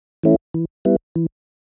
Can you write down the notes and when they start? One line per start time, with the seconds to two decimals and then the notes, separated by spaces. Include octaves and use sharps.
0.23 E3 A3 C#4 E4
0.54 E3
0.85 G3 B3 E4
1.16 E3